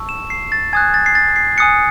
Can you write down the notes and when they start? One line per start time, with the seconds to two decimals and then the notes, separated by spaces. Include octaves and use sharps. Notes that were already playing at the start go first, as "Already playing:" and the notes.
Already playing: A5 C#6 E6
0.09 E7
0.30 C7
0.52 A6
0.73 G#5 D#6 F#6 G#6
0.94 A6
1.06 C7
1.15 A6
1.36 C7
1.58 G#5 D#6 F#6 C#7